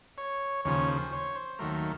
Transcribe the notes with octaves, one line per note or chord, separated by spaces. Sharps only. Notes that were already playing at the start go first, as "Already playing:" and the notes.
C#5
D#2 C#3 F3 C#5
C5
C#5
C5
D#2 D#3 F#3 A3 A#4